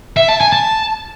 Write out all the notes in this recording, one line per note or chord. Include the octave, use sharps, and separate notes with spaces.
E5
A5
G#5
A5